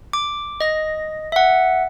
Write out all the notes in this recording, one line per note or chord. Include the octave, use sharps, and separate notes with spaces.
D6
D#5 A#6
E5 F#5